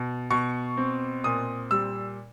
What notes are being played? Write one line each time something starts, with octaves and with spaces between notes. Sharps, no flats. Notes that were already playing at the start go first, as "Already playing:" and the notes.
Already playing: B2
B2 C#6
C4
A#2 D#6
G3 E6